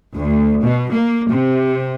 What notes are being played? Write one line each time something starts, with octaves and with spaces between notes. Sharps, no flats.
D2
B2
A#3
C3